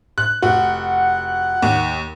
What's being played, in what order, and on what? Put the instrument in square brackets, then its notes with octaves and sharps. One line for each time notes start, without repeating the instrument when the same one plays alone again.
[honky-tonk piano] F#6
[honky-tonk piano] F1 F#4 [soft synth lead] F#5
[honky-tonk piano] D#2